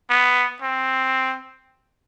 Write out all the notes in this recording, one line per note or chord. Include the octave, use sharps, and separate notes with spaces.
B3
C4